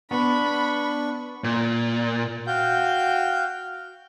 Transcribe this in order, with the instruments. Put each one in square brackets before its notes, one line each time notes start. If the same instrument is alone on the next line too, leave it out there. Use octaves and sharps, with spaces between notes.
[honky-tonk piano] B3 [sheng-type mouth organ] D4 C#6 [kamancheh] B5
[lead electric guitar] A#2
[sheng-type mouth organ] F#4 F5 G5 G6